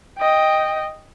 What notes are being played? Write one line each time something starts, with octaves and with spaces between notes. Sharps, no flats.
D#5 G5